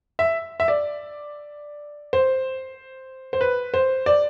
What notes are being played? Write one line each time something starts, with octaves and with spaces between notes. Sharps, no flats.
E5
E5
D5
C5
C5
B4
C5
D5